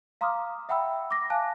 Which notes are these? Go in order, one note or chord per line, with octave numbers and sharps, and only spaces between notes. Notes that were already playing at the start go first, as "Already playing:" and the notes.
F5 A#5 C6 D6 D#6 F6
E5 F#5 G5 B5 E6
D6 A#6
F5 G#5 A5 F#6